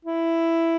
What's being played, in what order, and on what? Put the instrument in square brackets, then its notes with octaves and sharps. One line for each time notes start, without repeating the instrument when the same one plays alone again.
[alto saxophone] E4